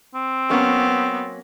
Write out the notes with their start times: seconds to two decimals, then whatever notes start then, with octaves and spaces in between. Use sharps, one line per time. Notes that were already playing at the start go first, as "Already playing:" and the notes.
0.15 C4
0.50 F#3 A#3 B3 C#4